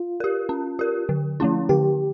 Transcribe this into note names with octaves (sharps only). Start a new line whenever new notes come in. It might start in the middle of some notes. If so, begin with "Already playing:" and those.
Already playing: F4
G4 A#4
C#4
G4 A#4
D3
F3 A3 C#4 E4
D3 G4